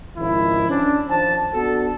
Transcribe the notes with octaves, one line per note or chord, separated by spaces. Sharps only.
G#1 C#2 D#3 F3 E4
C#4 D4
D#3 F3 C5 A5
B3 D4 F#4 A4